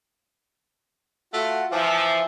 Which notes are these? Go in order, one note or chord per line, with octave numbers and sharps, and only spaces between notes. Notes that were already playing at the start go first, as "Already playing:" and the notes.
A3 F4 F#4 F#5
E3 F3 E5 A5 D6